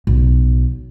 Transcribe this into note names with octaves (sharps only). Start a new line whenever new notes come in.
B1